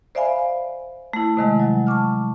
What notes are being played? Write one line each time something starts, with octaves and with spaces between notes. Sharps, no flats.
C5 D5 E5 F5 G#5 B5
A3 E4
C3 D#3 G#3
F#3 G3
A5 C#6 D6 F6